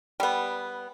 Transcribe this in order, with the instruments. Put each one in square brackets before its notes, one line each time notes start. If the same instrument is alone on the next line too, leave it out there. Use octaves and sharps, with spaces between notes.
[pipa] G3 B3